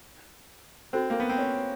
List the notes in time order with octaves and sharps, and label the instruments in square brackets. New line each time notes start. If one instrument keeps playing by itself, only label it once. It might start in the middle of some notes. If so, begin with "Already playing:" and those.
[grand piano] C4 [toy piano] D#4 F#4 A4 C5
[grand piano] A#3
B3
C4
C#4